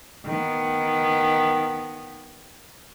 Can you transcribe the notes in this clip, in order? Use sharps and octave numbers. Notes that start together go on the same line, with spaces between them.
D#3 B3